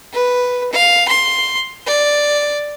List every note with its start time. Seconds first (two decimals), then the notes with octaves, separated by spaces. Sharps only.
0.13 B4
0.72 F5
1.09 C6
1.87 D5